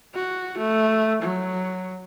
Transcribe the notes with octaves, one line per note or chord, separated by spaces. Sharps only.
F#4
A3
F#3